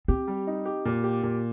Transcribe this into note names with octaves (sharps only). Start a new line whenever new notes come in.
C4 G4
G3
D#4
G4
A#2
G4
A#2